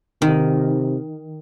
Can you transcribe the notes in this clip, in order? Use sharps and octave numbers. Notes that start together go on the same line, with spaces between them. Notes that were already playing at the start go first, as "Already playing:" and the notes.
C3 D#3